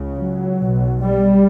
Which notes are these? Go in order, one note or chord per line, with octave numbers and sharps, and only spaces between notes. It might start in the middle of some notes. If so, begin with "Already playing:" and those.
Already playing: C#2 C#3
F#3
B1 B2
G3